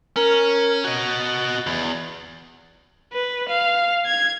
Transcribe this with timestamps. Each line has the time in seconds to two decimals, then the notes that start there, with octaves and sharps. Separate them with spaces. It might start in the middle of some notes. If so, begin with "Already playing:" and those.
0.16 C#4 A#4
0.84 F#4 D#5
1.07 A6
1.67 E2
3.13 B4
3.49 F5
4.06 G#6